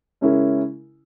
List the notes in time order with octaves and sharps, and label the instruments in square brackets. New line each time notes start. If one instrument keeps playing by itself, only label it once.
[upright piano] C#3 G#3 C#4 E4 A#4